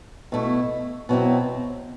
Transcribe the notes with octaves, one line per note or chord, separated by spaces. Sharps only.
B2 A3 E4
B2 F#3 C4 E4